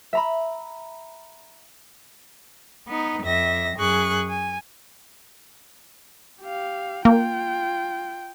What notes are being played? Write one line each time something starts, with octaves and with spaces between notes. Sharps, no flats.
E5 A#5 B5
B3 D#4
F2 E5 A#6
F#2 G#4 C#6 F#6
G#5
G4 F5
A#3 F4 G5